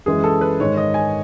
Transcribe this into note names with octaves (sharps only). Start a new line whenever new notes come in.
F#2 E3 G#3 G#4
A4
B4
G#2 D#3 G#3 C#5
D#5
G#5